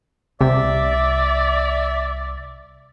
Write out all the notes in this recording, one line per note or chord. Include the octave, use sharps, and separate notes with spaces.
C2 C3 D5 E5